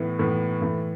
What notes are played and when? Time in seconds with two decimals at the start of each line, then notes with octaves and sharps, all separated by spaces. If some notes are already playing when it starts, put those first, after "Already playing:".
Already playing: A2 E3 B3
0.19 A2 E3 B3
0.61 A2 E3 A3